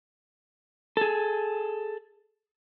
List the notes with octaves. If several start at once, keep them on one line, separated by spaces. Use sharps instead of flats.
G#4 A4